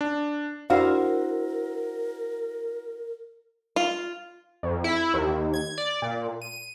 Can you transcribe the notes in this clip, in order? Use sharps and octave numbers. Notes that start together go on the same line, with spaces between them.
D4
D4 E4 F#4 A#4 C5 F5
F4
F2
E4
D#2
G#6
D5
A#2
D#7